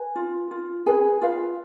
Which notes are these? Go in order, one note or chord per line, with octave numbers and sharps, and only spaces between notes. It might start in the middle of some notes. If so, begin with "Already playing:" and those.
Already playing: B4 G#5
F4
F4
G#4 B4 G#5
F4 B4 F5